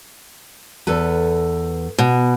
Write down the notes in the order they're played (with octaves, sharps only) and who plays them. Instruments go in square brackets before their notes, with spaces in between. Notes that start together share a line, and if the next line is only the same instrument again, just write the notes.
[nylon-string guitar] E2 A4 B4
[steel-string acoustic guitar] B2